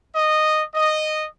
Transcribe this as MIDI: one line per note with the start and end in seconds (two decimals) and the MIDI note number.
0.15 0.63 75
0.75 1.26 75